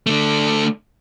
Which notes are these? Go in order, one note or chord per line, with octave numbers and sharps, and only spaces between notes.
D3 A3